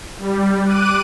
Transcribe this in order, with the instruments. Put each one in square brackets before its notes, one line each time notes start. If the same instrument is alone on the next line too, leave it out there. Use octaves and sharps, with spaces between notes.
[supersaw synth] G3
D6 F#6 D#7